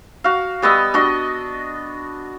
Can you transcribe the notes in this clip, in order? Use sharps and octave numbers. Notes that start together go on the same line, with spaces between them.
F#4 F5
G3 B3 D#5 E6
D4 F#4 D#5